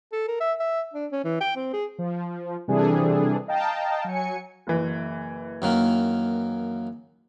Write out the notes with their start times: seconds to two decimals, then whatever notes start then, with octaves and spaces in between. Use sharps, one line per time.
0.12 A4
0.28 A#4
0.40 E5
0.60 E5
0.94 D4
1.12 C#4
1.24 E3
1.40 G5
1.56 C4
1.73 G#4
1.99 F3
2.68 C3 E3 G3 D4 G#4 A4
3.48 D#5 F5 G5 A5 A#5
4.04 F#3 G#5 C#7
4.67 F#1 E3
5.62 F#2 D#3 A#3